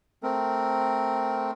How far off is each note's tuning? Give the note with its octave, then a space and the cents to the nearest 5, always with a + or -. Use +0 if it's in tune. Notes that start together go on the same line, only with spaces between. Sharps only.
A3 +0 C4 +0 A#4 +0